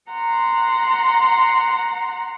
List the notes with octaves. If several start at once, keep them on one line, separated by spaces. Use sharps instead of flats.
F#5 A#5 C6